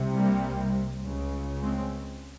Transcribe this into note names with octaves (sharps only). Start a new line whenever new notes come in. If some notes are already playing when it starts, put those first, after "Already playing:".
Already playing: C2 C3
G3 A#3
C#2 C#3
G#3 C4